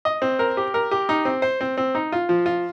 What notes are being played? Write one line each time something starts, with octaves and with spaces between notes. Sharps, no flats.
D#5
C4
A#4
G4
A#4
G4
D#4
C4
C5
C4
C4
D#4
F4
F3
F4